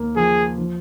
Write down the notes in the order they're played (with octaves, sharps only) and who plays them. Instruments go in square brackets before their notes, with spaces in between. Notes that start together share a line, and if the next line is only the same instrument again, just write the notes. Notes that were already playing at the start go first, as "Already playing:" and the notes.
Already playing: [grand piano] D#2 A#3
[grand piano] F3 [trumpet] G#4
[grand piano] F3